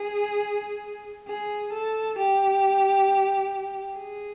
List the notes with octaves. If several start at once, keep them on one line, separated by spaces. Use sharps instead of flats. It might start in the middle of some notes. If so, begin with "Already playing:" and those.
Already playing: G#4
G#4
A4
G4
G#4